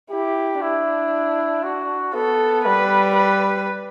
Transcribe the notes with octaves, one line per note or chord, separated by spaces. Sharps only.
E4 G4
D4 E4
F#4
B3 A4
G3 B4
B4